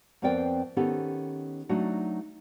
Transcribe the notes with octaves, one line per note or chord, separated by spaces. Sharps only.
F2 B3 C4 A#4 D5 G5
D#3 B3 C#4 D#4 G4 A4
F#3 A3 D4 D#4 F#4